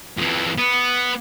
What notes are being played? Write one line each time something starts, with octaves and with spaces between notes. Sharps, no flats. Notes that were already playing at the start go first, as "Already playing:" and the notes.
F2 E3
B3